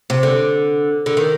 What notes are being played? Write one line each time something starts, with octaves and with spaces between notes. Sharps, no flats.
C3
D3
D3
D#3